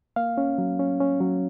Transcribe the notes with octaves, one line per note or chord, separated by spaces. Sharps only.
A#3 F5
C#4
F#3
C#4
C#4
F#3